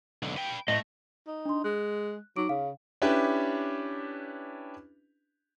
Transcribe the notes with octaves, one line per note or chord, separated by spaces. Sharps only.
B1 D3
B4 G5
A2 A3 D#5
D#4
D4 C6
G#3 F#6
F#3 D#4 D6 D7
C#3 F5
C#4 D4 E4 G4 B4